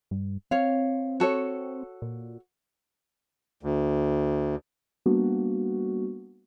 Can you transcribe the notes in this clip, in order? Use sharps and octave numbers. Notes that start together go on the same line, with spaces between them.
G2
C4 C#5 F5
F#4 A4 C#5
A#2
D2
G3 A#3 B3 D4 F#4